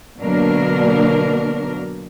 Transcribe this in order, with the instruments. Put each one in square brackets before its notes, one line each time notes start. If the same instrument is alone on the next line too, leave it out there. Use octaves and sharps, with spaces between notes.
[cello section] B2 D3 F#3 A#3 D4 A#4